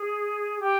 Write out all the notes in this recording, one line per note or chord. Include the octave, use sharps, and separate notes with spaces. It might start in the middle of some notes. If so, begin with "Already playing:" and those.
Already playing: G#4
G4